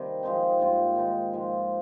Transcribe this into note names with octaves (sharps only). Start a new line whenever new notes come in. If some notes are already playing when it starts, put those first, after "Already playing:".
Already playing: C3 D#3 G3 A#3
F3 G#3 C4 D#4
G#2 G3 A#3 F4
D#3 G#3 D#4
G#2 F3 G#3